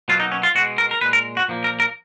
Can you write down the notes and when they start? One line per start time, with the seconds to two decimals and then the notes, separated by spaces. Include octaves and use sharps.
0.08 B2 F#3 A#3 F4
0.20 D#4
0.32 C#4
0.43 F4
0.55 B2 G#3 F#4
0.78 A#4
0.91 A#4
1.01 A#2 G#3 B4
1.13 A#4
1.37 F#4
1.48 A#2 F3 A#3
1.64 A#4
1.80 A#4